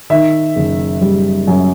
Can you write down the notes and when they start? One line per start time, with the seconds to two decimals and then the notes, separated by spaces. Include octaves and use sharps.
0.10 D#3 E5
0.56 F#1
1.01 G3
1.48 F#2